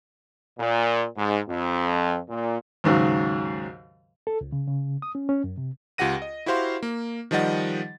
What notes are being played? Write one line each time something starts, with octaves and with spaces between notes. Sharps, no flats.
A#2
G#2
F2
A#2
D#2 G#2 C#3 F#3
A4
C#2
C#3
C#3
D#6
C#4
C#4
F#2
C3
C#2 F4 G4 F#5 A#6 D#7
D#5
E4 F#4 G4 C5 F5 C6
A#3
D#3 F3 G3 D#5 F#5 A6